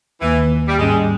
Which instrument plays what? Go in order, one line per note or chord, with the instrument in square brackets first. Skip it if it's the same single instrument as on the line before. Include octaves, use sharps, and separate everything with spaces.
[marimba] D#2 D#3 A#3 [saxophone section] E3
[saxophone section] G3
[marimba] G#2 G3 C#4 [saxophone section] G#3